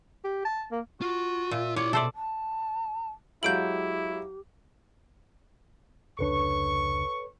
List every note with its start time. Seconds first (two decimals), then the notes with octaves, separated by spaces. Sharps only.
0.24 G4
0.45 A5
0.71 A#3
1.02 F4 F#4
1.51 A#2 E5
1.76 E4 C#5 D5 C6
1.93 B2 A4 C5 D5 E5
2.15 A5
3.43 F#3 G#3 E4 G4 F5 G6 D7 F#7
6.19 F1 C#2 D4 A4 B4 C#5 C#6